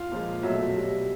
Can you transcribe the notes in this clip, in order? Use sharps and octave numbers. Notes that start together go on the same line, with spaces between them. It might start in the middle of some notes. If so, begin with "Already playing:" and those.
Already playing: F4 F5
A#2 F3 G#3
B2 F#3 A3 E5
B2 G3